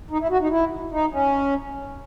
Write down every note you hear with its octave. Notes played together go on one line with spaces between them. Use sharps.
D#4
E4
F#4
D#4
E4
D#4
C#4